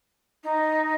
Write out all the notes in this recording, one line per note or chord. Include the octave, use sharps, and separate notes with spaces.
D#4